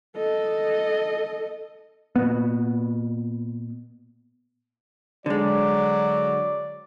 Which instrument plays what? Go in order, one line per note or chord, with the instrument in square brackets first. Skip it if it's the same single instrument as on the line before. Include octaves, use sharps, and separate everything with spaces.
[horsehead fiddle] A4 D#5
[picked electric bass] A#2 B3
[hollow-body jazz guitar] D3 G#3 [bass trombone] F#3 [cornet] D5